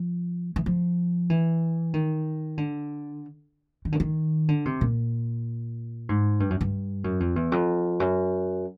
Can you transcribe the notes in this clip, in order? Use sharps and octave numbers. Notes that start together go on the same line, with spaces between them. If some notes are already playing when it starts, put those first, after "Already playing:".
Already playing: F3
E3
F3
E3
D#3
D3
D#3
D3
D#3
D3
C3
A#2
G#2
G2
F#2
G2
F#2
F2
E2
F2
F#2